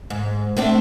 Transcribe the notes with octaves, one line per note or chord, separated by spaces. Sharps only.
G#2
A3 C4 D4